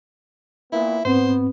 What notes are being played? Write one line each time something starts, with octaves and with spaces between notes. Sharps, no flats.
A#2 B3 E4
G#2 B3 C4 C5